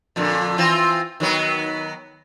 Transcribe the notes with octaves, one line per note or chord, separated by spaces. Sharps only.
F2 A#2 D3
E3 C4 F4
D#3 F#3 B3